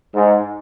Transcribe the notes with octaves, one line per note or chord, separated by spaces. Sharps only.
G#2